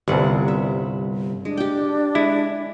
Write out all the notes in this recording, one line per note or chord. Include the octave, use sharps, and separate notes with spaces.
G1 C2 G3 F#5
E5
G#3 D4
G4 G5
G#3 E4